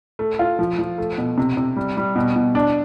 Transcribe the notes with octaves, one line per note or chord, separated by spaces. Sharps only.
A3
F4
F3
F3
A3
B2
C3
C3
G3
G3
B2
B2
D4